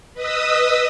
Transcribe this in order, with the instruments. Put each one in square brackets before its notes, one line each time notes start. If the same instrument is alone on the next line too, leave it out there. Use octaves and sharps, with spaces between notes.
[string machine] B4 D#5 B5 D#6 E6